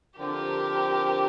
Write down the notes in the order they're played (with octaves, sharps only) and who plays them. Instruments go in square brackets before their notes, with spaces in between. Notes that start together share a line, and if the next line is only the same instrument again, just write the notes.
[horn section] D3 F3 C4 [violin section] G4 A#4